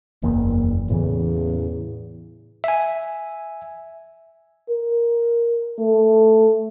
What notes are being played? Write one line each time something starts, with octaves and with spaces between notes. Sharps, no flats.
F#1 E2 A#3
E2 A2 C#3 E3
E5 G#5
A#4
A3